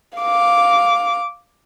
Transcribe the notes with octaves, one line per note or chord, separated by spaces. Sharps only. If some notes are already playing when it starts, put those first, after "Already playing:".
F5 D6